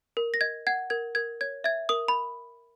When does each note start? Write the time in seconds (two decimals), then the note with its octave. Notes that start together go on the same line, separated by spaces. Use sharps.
0.17 A#4
0.34 A#6
0.41 D#5 G#6
0.67 F#5 G#6
0.90 A#4 G#6
1.15 A#4 G#6
1.41 C#5 G#6
1.64 E5 G#6
1.89 A#4 D#6
2.08 B5